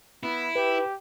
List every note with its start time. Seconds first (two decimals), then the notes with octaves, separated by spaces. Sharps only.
0.23 B3 E4
0.56 G4 B4